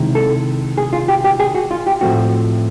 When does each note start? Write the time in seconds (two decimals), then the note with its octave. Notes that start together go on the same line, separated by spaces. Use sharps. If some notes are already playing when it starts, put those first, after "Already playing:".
Already playing: C3 D#3 G#3 C4 E4
0.15 A4
0.78 G#4
0.93 F4
1.08 G4
1.24 G4
1.40 G#4
1.55 F#4
1.71 F4
1.87 G4
2.01 A2 F3 A3 C4 F#4